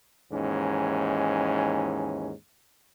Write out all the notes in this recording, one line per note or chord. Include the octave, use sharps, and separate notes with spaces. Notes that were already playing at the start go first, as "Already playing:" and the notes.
D#2 G#2 E3 C#4